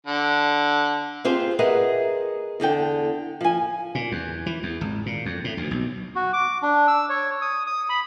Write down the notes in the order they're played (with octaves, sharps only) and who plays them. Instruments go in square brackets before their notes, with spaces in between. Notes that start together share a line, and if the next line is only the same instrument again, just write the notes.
[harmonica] D3
[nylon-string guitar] C4 F4 G4 G#4 C5
G#4 A#4 B4 D#5 E5 F#5
E2 D3 A4 G5
F3 G#5
[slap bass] A#2
E2
E3
E2
G#1
A#2
F2
A2
D2
B1
[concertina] F#4
D6
D4
E6
C#5
D#6
D#6
B5